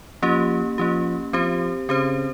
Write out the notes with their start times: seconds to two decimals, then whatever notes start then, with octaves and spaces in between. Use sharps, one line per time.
0.22 F3 A#3 C#4 G4
0.78 F3 A#3 C#4 G4
1.33 F3 C4 G4 C5
1.89 C#3 C4 G4 C5